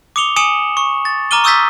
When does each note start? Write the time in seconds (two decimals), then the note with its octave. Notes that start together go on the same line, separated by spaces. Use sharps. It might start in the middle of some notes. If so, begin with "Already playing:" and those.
0.16 D6 D#6 C#7 F7 G7
0.36 G#5 D#6 C#7 E7 F#7
0.77 C#6
1.05 A6
1.31 A#5 D6 F6 D#7 G7
1.44 C#6 D#6 E6 G6 A6 B6